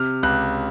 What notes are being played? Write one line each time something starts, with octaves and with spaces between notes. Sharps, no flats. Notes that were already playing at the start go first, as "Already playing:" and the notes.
Already playing: C3 F6
C#2 F#6